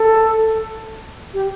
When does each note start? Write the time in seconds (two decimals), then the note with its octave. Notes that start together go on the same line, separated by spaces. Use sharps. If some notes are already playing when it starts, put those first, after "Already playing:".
Already playing: A4
1.34 G4